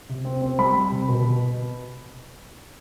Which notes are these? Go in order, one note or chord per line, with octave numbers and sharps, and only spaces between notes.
C3
C4
C4
G3 B5
G3
C3
B2
B2